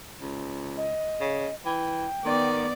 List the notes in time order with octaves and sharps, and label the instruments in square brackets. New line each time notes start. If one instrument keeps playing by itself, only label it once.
[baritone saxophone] C#2
[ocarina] D#5
[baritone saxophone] C#3
[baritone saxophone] E3 [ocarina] G5
[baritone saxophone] D#3 [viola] B3 D5